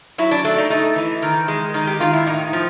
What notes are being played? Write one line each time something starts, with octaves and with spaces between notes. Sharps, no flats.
F#3 E4
D4
A3 D4
D#4
A3 D#4
E3
D#3
G#3
D#3 D#4
G4
D#3 F4
E4
A2 D#4
F3